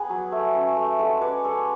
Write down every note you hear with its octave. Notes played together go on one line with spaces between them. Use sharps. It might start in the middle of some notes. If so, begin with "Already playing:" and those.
Already playing: B3 G#4 B4
F#3
A3
C#4
A3
G#3 F#4 A4
C#4 B4 C#5 D5
G#3 A4 C#5